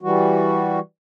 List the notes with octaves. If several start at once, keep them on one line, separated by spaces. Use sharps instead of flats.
E3 G3 F#4